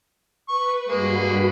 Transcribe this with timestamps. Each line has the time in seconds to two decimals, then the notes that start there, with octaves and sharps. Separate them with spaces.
0.48 B4 C#6
0.89 G2 G#3 A#3 F#4 B5